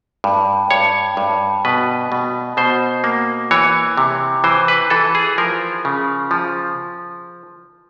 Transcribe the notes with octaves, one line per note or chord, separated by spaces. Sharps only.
G2
G2 C#5
G2
B2 B4
B2
B2 C5
A#3
E3 C#5
C3
E3 C5
B4
E3 A4
G#4
F3 A#4
C#3
F3